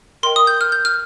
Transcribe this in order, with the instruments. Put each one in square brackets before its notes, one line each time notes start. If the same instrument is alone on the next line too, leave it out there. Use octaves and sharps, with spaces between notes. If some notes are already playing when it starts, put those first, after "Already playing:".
[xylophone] A#4 D#5 G5 C6
D#6
G6
F6
G6
F6